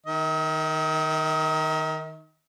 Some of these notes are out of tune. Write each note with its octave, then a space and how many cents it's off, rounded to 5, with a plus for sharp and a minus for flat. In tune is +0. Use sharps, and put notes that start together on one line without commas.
D#3 +0 D#5 +45